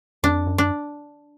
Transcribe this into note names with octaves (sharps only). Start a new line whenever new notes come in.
F2 D4
F#2
D4